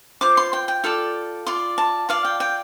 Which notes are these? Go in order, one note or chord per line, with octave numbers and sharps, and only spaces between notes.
F4 C5 D6
C6
G5
G5
F4 A4 D5
F4 D5 C6
A5
F4 D5 F5
G5
G5